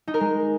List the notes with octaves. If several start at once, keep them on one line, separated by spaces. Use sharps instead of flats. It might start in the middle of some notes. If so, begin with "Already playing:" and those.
D#4
A#4
G#3